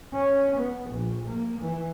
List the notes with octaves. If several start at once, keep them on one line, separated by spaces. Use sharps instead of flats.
C#4
B3
A#1
A#3
E3